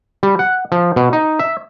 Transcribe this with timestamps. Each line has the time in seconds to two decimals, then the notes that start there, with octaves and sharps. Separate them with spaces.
0.23 G3
0.39 F#5
0.72 F3
0.96 B2
1.13 D#4
1.39 E5